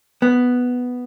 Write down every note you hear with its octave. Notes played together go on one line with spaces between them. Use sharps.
B3